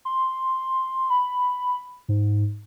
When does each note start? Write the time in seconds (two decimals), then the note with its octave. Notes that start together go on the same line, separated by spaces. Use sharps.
0.05 C6
1.10 B5
2.09 G#2